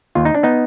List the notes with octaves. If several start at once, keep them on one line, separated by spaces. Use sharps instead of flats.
D#2 F4
D#4
D4
B3 D#4